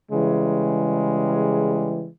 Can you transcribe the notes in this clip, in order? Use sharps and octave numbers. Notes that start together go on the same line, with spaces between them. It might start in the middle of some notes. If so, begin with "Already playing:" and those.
C#3 E3 G3 G#3